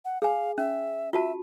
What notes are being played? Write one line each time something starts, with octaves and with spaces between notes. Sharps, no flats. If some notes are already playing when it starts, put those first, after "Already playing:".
F#5
G#4 F5 G#5
C#4 E5
F4 F#4 E5 A5